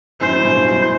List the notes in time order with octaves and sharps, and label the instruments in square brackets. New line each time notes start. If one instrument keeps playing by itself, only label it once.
[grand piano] F#2 A2 [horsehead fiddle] C5
[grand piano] G2 B2
F#2 A2